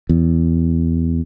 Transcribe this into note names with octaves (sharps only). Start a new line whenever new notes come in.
E2